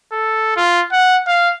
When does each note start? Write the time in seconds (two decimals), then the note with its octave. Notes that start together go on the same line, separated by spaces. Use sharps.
0.13 A4
0.56 F4
0.92 F#5
1.27 F5